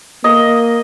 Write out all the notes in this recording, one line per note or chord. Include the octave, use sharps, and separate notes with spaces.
A#3 D#5